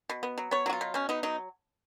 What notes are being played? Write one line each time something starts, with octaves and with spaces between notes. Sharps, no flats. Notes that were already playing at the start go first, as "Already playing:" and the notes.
B2
B3
F#3
B3 C#5
F#3 F#4
F4
B2
B2 C#4
B3 D#4
F#3 D#4